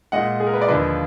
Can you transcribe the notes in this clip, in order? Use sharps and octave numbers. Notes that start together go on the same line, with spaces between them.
A#2 G#3 D#5 F#5
G#4
A#4
B4
D5
D#2 D3 F3 A#3 B4 D#5